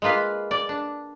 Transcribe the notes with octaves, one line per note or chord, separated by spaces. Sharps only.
G#3 A#3 F4 B4 F5
D5
D4